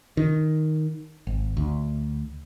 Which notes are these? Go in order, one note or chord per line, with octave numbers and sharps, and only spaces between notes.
D#3
G#1
D2